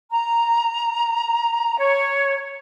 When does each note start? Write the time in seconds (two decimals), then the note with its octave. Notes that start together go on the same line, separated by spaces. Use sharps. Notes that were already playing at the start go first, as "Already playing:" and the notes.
0.10 A#5
1.79 C#5